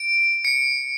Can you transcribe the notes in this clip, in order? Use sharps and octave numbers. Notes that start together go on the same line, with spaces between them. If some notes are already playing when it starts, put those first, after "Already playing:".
Already playing: D7
C#7